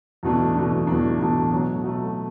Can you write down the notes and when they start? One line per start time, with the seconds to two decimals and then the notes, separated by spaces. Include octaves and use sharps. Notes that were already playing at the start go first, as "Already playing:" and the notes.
0.23 E2 B2 A3 D4
0.55 E2 B2 A3 D4
0.87 E2 B2 A3 D4
1.19 E2 B2 A3 D4
1.51 B2 F#3 A3
1.84 B2 F#3 A3